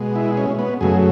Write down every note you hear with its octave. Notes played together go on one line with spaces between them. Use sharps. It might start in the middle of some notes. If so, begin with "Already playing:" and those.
Already playing: B2 G#3
E4
C#4
B3
F#2 C#3 F#3 A3 G#4